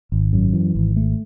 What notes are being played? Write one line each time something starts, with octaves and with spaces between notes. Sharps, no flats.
G#1
F#2
E3
G#1
A3